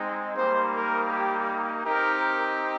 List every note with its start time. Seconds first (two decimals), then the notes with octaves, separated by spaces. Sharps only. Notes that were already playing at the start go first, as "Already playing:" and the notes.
Already playing: G#3 C4 D#4
0.35 G3 A#3 D#4 C5
0.73 A#4
1.09 G4
1.84 C4 D#4 G4 A#4